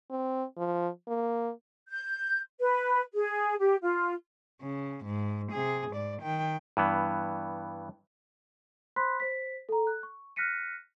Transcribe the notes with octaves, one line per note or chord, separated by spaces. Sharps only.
C4
F3
A#3
G6
B4
G#4
G4
F4
C#3
G#2
C3 G#4
G#2 D5
D#3 G5
G2 E3 B3
C5 B5 C6 F#6 B6
C5 B6
A4 A#5
F#6
C#6
F6 F#6 A#6 B6 C#7 D#7